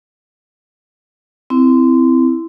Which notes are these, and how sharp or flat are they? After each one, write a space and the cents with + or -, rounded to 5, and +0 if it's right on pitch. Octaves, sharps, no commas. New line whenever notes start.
C4 -20 E4 +0